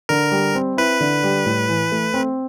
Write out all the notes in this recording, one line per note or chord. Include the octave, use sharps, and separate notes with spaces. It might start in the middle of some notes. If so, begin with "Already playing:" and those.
D3 A#4
G3
C4
E4 B4
D3
G3
A2
E3
A3
C4